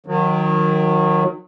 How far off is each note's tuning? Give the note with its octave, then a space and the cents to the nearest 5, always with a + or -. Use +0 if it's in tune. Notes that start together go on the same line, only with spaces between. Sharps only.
D#3 +0 F#3 -30